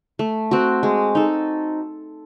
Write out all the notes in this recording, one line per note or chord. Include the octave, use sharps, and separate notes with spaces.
A3
C4 F#4
G#3
D#4 A4